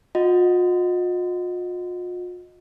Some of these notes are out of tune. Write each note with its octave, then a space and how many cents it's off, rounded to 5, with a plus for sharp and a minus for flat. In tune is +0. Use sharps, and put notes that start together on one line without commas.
F4 +45 D#5 +0 F#5 +0